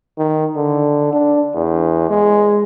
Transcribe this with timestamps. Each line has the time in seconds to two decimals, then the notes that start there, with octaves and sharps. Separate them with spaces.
0.18 D#3
0.57 D3
1.13 D4
1.55 E2
2.10 G#3